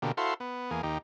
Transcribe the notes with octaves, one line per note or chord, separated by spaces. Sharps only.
B2 D3 A#3 G4
E4 F#4 A4 C5 F5 C6
B3
E2 A#3 G#4
D#2 D#4 G4